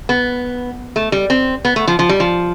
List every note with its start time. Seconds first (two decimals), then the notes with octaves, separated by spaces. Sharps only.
0.09 B3
0.96 A3
1.12 G3
1.30 C4
1.65 B3
1.76 A3
1.87 F3
1.99 F3
2.09 G3
2.20 F3